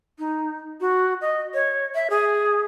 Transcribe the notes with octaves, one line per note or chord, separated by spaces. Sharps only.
D#4
F#4
D#5
C#5
E5
G#4